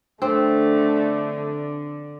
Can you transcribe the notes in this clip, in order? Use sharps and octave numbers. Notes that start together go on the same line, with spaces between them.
D3 A3 C4 D4